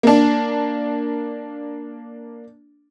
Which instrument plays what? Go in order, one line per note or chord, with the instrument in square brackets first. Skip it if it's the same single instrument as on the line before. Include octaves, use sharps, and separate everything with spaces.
[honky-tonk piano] A#3 D4